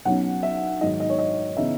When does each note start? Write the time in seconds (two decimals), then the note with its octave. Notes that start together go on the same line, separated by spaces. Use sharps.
0.05 B1 B2 F#3 C#4 F#5
0.43 E5
0.81 G#2 D#3 F#3 D#5
1.00 D#5
1.10 C#5
1.19 D#5
1.57 C#3 E3 B3 D#4 E5